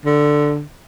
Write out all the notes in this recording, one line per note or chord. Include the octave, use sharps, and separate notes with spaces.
D3